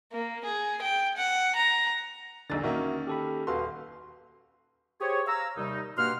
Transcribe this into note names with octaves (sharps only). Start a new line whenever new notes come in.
A#3
G#4
G5
F#5
A#5
E1 A#1 D3 D#4 A6
D#3 A#3 C#4 F#4 A#4 E5
G4 A4 B5
D#1 F#4 A4 B4 F5 C6
G4 G#4 C5 C#5
F5 A#5 E6
D#2 C3 G3 D#4
G2 B2 A#3 F#5 C6 F6